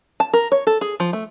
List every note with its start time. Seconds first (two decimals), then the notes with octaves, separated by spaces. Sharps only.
0.20 A5
0.33 A#4
0.52 C#5
0.67 A4
0.81 G#4
1.00 F3
1.13 A3